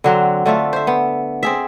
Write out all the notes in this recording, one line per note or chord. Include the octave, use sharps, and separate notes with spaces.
D3 F#3 C4
D3 A3 F4 E5
C5 E5
B3
C4 G#4 E5